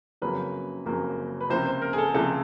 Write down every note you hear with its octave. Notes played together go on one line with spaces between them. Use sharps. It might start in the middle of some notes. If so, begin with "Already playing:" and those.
F#1 F2 C#3 F#3 A#3 B4
F#1 F2 C#3 F#3 A#3
B4
C#2 C3 F3 A#3 C5
C5
A#4
G#4
A4
C#2 C3 F3 A#3 A4